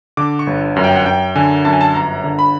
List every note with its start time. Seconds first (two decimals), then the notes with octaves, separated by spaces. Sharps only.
0.17 D3 D6
0.39 C#6
0.47 G1
0.76 F#2
0.84 G5
0.96 F#5
1.06 F#2 G5
1.36 D3 G#5
1.65 F#2 A5
1.73 G#5
1.81 A5
1.94 G1 A#5
2.24 D3
2.39 B5